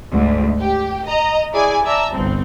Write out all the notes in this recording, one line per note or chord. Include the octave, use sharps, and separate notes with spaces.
D2 G#2
G4
D#5 A#5
E4 G#4 D5 G#5
D5 E5 A5 A#5 E6
G1 C2 C4